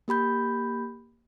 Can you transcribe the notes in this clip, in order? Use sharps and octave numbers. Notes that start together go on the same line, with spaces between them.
A#3 G4 B5 G6